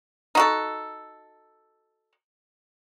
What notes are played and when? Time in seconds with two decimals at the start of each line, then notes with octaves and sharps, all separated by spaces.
0.35 D#4 F#4 A4